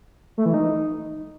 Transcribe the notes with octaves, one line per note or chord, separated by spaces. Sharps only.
A3
E3
D#4